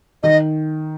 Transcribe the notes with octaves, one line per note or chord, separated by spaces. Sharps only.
D#3 D#5